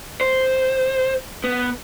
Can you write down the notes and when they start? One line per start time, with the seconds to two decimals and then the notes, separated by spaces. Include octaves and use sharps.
0.21 C5
1.44 B3